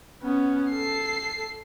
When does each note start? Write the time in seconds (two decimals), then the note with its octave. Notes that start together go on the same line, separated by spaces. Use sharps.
0.23 B3 C#4
0.71 A4 C7